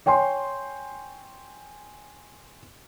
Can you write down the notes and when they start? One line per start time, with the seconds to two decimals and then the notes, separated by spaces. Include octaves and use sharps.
0.06 C#5 G5 G#5 C6